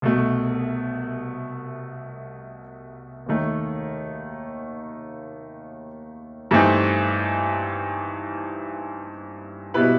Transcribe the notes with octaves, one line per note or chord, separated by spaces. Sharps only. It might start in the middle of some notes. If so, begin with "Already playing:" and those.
C2 B2 A3
D#2 D#3 A3
G2 E3 A3 C4 D#4
B2 G3 B3 E4 B4